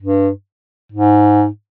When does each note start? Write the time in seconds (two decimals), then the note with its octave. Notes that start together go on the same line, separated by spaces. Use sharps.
0.02 G2
0.92 G#2